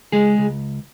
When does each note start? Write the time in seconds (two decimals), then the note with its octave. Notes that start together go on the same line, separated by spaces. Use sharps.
0.12 C#2 G#3 G#4
0.38 C#2